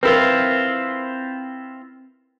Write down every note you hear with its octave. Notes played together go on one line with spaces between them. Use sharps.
C4 E4 F4 A#4 B4